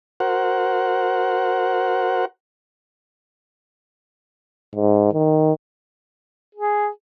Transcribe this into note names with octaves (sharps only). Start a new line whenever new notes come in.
F#4 A#4 C5 F#5
G#2
D#3
G#4